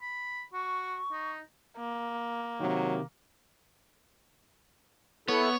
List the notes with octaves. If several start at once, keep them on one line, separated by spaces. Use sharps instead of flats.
B5
F#4 C#6
D#4
A#3
C3 D#3 F#3
B3 E4 A4 C#5